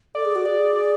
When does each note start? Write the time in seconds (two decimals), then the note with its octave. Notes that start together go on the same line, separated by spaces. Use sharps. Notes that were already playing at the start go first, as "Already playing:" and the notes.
0.15 A4 D5
0.25 G#4
0.35 F#4
0.45 G#4 D5
0.75 D5